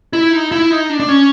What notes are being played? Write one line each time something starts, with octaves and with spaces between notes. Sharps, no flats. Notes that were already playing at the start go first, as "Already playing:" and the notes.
E4
D#4
E4
D#4
D4
D4
C#4